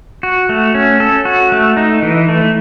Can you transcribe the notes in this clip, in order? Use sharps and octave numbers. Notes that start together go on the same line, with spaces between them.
F#4
A3
C#4
A4
F#4
A3
D#4
E3
A3